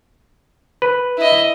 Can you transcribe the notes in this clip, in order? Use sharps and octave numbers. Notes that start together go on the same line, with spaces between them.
B4
E4 D#5